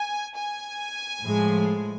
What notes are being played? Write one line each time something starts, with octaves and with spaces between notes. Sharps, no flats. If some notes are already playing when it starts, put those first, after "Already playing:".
Already playing: G#5
G#5
A2 F3 G#3